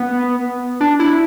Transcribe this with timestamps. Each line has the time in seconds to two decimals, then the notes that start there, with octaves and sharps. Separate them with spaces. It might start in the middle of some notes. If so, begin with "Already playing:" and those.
Already playing: B3
0.81 D4
1.00 E4